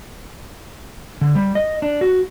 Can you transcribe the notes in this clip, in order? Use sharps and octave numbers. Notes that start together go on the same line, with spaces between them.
D3
G3
D#5
D4
F#4